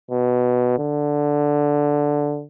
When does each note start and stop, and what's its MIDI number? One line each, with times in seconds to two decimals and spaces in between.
0.11 0.74 47
0.78 2.44 50